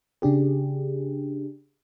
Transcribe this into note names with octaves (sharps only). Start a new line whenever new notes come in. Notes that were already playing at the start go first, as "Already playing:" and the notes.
C#3 D4 G4 G#4